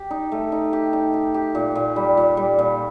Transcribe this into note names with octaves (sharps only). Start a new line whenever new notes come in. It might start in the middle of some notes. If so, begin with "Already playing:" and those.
Already playing: G4
D#4
A3
D#4
G4
D#4
G4
G4
A#2
A#2
G3
A#2
G3
A#2